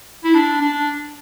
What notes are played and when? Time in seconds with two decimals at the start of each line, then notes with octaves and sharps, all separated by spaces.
0.24 E4
0.34 D4
0.61 D4